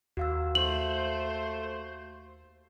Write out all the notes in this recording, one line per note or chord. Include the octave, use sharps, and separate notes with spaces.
D#2 F#4 F5 E6
A3 C5 F#7